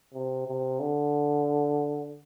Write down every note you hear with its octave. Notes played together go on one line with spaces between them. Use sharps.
C3
C3
D3